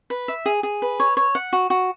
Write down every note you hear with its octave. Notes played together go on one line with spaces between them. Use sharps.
B4
E5
G#4
G#4
B4
C#5
C#5
F#5
F#4
F#4